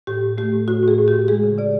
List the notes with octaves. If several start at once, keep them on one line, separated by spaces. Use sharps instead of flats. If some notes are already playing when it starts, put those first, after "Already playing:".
A2 G4
A2
A3 G4
A2
A2 F#4
A2
G#4
A2
G4
A2
G#3 G#4
C#3
C#3 D5